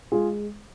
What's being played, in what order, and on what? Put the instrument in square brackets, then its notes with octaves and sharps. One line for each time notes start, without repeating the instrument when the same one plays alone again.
[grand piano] G#3 F4 G#4